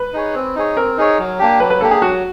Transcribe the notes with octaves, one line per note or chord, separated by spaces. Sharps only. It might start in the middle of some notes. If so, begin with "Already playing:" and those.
Already playing: B4
D#4 G#4 C#5
C4
D#4 G#4 C#5
C4 A#4
D#4 G#4 C#5
F#3
A#3 D4 G4
F#3 B4
B4
A#3 D4 G4 A4
G#4
F#3 F#4